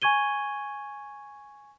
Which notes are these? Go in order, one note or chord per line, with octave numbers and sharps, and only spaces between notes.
G#5 C#6 G#6 D#7 G7